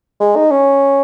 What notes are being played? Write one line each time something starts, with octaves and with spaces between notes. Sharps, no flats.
G#3
D#4
C#4